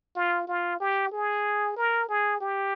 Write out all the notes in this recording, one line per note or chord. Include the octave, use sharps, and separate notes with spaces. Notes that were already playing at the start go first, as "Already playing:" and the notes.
F4
F4
G4
G#4
A#4
G#4
G4